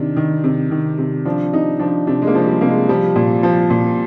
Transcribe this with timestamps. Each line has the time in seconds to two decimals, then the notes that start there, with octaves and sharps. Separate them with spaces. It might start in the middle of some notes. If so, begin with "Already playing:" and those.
Already playing: C3 D#3 D4
0.17 D#3
0.44 C3
0.71 D#3
0.98 C3
1.25 F3 D4
1.53 C3 D#4
1.79 F3 D4
2.07 C3 D4
2.22 G#3
2.27 A#3
2.35 F3
2.47 G3
2.61 C3 A#3
2.69 G#3
2.89 F3 G3
3.16 A#2
3.43 F3
3.70 A#2